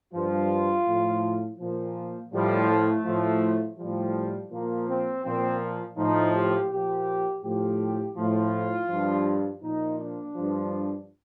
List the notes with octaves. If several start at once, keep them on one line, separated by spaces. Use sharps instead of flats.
G2 F3 F4
A2 F3
A#2 F3
A2 F3 G3
A3
A2 F3
A2 F3 G3
A#2 F3 A#3
C4
A#2 F3 C4
A2 F3 D#4
G4
A#2 F3 G4
A2 F3 G4
A2 F3 F4
G2 F3
A#2 F3 D#4
D4
G2 F3